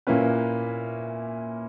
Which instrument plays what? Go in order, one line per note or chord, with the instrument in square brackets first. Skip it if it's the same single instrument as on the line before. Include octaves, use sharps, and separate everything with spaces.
[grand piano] A#2 A#3 C#4 E4 B4